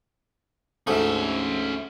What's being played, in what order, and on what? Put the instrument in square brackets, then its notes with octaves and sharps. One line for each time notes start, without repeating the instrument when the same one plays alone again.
[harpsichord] D2 G#2 A3 [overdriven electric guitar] C#4 E5